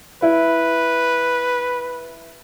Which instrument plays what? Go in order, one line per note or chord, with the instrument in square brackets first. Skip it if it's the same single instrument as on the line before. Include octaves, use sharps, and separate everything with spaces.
[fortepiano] E4 [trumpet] B4